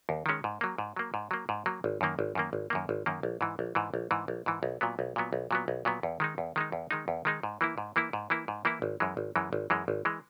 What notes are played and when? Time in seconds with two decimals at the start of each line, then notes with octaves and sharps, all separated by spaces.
0.09 D#2
0.26 D#3 G#3 C#4
0.44 G#2
0.61 F#3 A#3
0.78 G#2
0.96 F#3 A#3
1.14 G#2
1.31 F#3 A#3
1.49 G#2
1.66 F#3 A#3
1.84 G#1
2.01 F#2 D#3 A#3
2.19 G#1
2.35 F#2 D#3 A#3
2.53 G#1
2.70 F#2 D#3 A#3
2.89 G#1
3.06 F#2 D#3 A#3
3.23 A#1
3.41 G#2 E3
3.59 A#1
3.75 G#2 E3
3.94 A#1
4.11 G#2 E3
4.28 A#1
4.46 G#2 E3
4.63 B1
4.81 A#2 F#3 B3
4.99 B1
5.16 A#2 F#3 B3
5.33 B1
5.51 A#2 F#3 B3
5.68 B1
5.85 A#2 F#3 B3
6.03 E2
6.20 D#3 G#3 D#4
6.38 E2
6.56 D#3 G#3 D#4
6.72 E2
6.91 D#3 G#3 D#4
7.08 E2
7.25 D#3 G#3 D#4
7.43 G#2
7.61 E3 A#3 E4
7.78 G#2
7.96 E3 A#3 E4
8.13 G#2
8.30 E3 A#3 E4
8.48 G#2
8.65 E3 A#3 E4
8.82 G#1
9.00 F#2 E3 G#3
9.17 G#1
9.36 F#2 E3 G#3
9.53 G#1
9.70 F#2 E3 G#3
9.88 G#1
10.05 E3 G#3